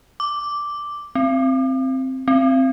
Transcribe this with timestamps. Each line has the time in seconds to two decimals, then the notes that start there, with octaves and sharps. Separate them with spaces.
0.20 D6
1.15 C4
2.28 C4